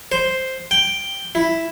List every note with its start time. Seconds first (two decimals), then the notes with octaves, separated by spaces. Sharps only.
0.12 C5
0.71 G5
1.35 E4